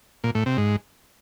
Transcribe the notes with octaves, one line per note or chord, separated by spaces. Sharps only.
A#2
A2
C3
G#2